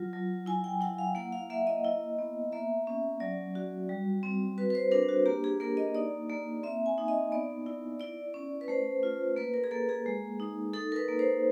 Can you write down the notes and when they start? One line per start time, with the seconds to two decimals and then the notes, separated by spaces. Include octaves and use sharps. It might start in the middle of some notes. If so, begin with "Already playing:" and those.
Already playing: F#3 F4
0.13 F#3
0.46 E4 G#5
0.64 G5
0.81 E4 F#5
0.98 F5
1.15 A#3 F#5
1.32 F5
1.50 A#3 E5
1.67 D#5
1.84 E4
2.19 B3
2.52 A#3 E5
2.87 C#4
3.20 F#3 D5
3.55 F#4
3.89 G3
4.23 C4
4.58 F#4 B4
4.70 B4
4.75 C5
4.91 D4 A#4
5.09 F#4
5.26 A#3 G4
5.44 G#4
5.60 A#3 A#4
5.77 D#5
5.95 D#4 D5
6.30 A#3
6.63 C4 E5
6.86 G#5
6.98 D#4
7.08 D#5
7.32 B3 D5
7.66 E4
8.00 E4 D5
8.34 C#4
8.61 B4
8.68 A3 C5
9.03 F4
9.37 A#3 B4
9.54 A#4
9.64 G#4
9.71 A#3 A4
9.89 G#4
10.06 G#3
10.40 D#4
10.74 D#4 A4
10.92 A#4
10.96 B4
11.08 A#3
11.19 C5